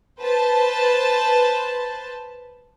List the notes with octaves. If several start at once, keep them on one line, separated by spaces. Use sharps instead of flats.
B4 C5 A5